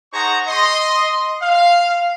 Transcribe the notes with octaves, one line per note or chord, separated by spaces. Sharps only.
D#4 G#4 C5 F#5 A#5 C#6
D#5 C6
F5